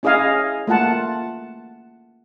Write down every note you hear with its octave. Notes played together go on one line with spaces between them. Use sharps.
C#4 E4 G#4 D#5 F5 G#5
A3 A#3 F4 F#5 A5